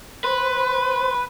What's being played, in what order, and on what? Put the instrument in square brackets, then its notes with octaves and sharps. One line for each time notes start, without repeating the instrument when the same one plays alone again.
[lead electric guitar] B4 [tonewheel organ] C5 C6